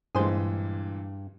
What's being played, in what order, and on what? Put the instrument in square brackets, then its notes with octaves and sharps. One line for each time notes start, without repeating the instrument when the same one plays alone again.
[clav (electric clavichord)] G2 [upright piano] A#2 E3 G#3 [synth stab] G#4 C5